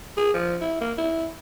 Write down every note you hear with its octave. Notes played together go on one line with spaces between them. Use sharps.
G#4
F3
E4
A#3
E4